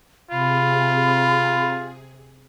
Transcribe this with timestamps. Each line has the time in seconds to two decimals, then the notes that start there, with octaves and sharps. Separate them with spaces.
0.31 C3 F4 G#4 B5